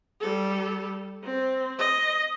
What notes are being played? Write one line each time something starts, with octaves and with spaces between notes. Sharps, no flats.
G3 A4
C4
D#5